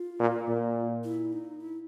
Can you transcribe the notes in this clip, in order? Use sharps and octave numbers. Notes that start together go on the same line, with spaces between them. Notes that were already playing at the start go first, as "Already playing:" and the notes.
Already playing: F4
A#2
A#2
E4
D#4
E4